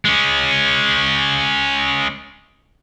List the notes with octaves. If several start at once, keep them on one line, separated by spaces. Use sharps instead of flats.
G#3 C#4